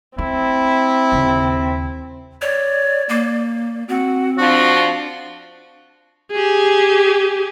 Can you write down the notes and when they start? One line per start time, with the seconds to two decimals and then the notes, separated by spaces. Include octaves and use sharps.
0.19 A3 C4 E4
1.12 D#2 C#3
2.42 C#5 D5
3.09 A#3
3.89 C4 F#4
4.38 F3 D4 F#4
6.31 G4 G#4